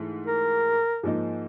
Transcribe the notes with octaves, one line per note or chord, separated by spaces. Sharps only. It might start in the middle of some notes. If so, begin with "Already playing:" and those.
Already playing: G#2 E3 A3
A#4
G#2 F3 A#3 D#4